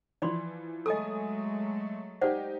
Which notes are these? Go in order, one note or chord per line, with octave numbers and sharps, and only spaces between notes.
E3 F3 D5 B5 C6
F#3 G#3 A3 A4 D#5 G#5 D#6
D#4 G4 C5 D5 F#5